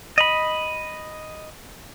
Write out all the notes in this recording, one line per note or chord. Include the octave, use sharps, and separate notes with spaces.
D#5 B5